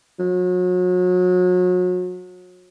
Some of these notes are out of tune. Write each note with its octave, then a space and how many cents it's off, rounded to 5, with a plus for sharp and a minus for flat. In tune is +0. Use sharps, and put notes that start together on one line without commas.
F#3 -35